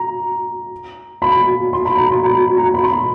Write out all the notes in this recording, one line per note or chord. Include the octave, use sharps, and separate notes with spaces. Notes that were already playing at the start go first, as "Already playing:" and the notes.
Already playing: A#5
B5
C6
B5
A#5
C6
B5
A#5
B5
C6
B5